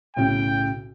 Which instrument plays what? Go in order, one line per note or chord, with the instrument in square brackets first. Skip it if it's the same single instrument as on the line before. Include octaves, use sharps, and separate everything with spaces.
[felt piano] B1 A2 C#3 [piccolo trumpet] G5